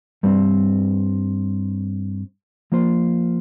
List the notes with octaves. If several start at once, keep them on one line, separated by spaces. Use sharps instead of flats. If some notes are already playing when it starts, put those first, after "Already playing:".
G2 G3 C4
F3 A#3 F4 C5